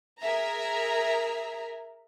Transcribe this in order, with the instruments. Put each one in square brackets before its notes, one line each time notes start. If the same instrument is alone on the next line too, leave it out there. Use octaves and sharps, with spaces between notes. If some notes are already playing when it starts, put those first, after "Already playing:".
[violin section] G#4 A#4 E5 A#5